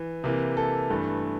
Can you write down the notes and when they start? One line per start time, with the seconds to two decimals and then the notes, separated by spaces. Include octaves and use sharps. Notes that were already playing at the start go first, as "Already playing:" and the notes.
Already playing: E3
0.24 C3 E3 A#3
0.57 A4
0.90 G2 E3 A3